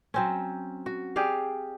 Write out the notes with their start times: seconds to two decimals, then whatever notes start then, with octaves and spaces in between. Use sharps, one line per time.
0.14 F#3 C4 C#4
0.86 F#4
1.16 G4 G#4 D5 F5